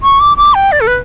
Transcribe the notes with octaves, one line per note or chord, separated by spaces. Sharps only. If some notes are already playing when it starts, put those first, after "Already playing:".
C#6
D6
D6
G5
D5
A4
B4